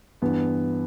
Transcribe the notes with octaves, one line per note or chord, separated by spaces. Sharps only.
G2 E3 B3